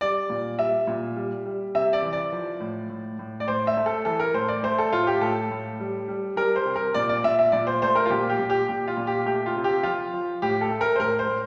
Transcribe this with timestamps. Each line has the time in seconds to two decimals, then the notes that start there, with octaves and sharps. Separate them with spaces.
0.01 G3 D5
0.30 A#2
0.58 G3 E5
0.87 A#2
1.16 G3
1.45 G3
1.75 C3 E5
1.93 D5
2.03 E3
2.13 D5
2.32 F3
2.60 A2
2.90 A2
3.19 A2
3.40 D5
3.48 A2 C5
3.67 E5
3.77 A3
3.86 A4
4.05 E3 A4
4.20 A#4
4.34 A2 C5
4.48 D5
4.63 A3 C5
4.79 A4
4.92 A2 F4
5.07 G4
5.21 A2 A4
5.51 A2
5.79 G3
6.08 G3
6.36 G3 A#4
6.56 C5
6.65 C3
6.76 A#4
6.94 A#2 D5
7.09 D5
7.24 A#2 E5
7.39 E5
7.52 A#2 D5
7.67 C5
7.82 A3 C5
7.95 A#4
8.06 F4
8.10 A#2 G4
8.29 G4
8.39 A#2
8.50 G4
8.68 A#2 G4
8.88 F4
8.97 A#2
9.07 G4
9.26 A3 G4
9.46 F4
9.56 C3
9.64 G4
9.83 F3 F4
10.13 F3
10.42 A2 G4
10.61 A4
10.70 A3
10.81 A#4
10.96 C5
11.00 A2 A#4
11.19 C5
11.28 A2